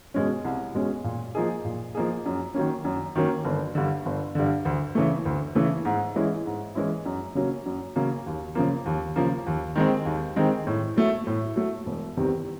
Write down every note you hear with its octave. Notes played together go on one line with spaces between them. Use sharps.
B2 G#3 C#4
C2
B2 G#3 C#4
A#2
F3 A#3 D#4 G#4
A#2
F3 A#3 D#4 G#4
F#2
D#3 F#3 A#3 C#4
F#2
D#3 F#3 A#3 C#4
G1
G2 D3
G1
G2 D3
D2
C#3 E3 A3
D2
C#3 E3 A3
G#2
E3 G#3 C#4 E4
G#2
E3 G#3 C#4 E4
F#2
C#3 F#3 A#3 C#4
F#2
C#3 F#3 A#3 C#4
D#2
C#3 F3 A#3
D#2
C#3 F3 A#3
D#2
D#3 G#3 C4
D#2
D#3 G#3 C4
A2
F#3 A3
A2
F#3 A3
E1
E2 C3 D#3 G3